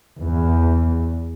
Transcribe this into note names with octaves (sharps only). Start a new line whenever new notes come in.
E2